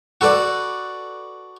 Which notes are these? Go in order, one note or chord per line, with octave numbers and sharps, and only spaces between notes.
F#4 A4 B4 D5